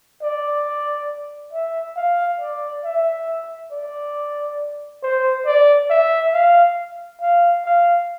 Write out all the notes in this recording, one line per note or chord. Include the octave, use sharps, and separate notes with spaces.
D5
E5
F5
D5
E5
D5
C5
D5
E5
F5
F5
F5